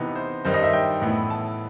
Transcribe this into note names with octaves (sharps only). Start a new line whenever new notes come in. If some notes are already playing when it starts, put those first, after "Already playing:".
Already playing: C3 E3 B3 D#4
C5
G2 D#3 G3 D#4 C5
D#5
E5
G5
A2 E3 B3 E4
A5